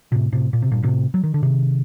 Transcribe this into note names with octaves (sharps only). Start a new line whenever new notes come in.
A2 C3
A2 C3
A#2
C3
G2 A#2
A2 C3
F#3
D#3
D3
C3 D#3